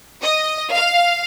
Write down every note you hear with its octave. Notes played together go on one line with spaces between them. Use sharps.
D#5
F5